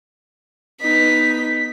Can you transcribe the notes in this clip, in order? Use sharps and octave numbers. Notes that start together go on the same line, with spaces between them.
B3 D#4 B6